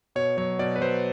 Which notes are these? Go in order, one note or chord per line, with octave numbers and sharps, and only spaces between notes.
B2 C#5
F#3 C#5
B2 D5
B4
F#3 C5